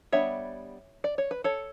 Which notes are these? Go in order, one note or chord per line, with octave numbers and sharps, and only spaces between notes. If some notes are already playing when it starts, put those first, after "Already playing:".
G3 B3 D4 C#5 E5
D5
C#5
B4
A4 C#5